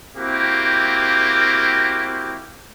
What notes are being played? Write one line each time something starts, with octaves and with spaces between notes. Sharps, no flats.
A#3 C4 E4 F#4 G4